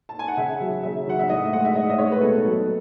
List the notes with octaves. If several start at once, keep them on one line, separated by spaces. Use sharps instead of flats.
A5
G#5
F#5
C#3 E5
F#3
C#3 E5
F#3 F#5
E5
A2 D#5
G#3 F#5
E5
A2 D#5
D#5
G#3 C#5
B4
B2 A4
F#3